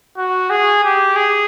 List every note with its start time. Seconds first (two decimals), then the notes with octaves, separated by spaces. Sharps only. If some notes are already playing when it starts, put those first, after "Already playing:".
0.17 F#4
0.50 G#4
0.84 G4
1.16 G#4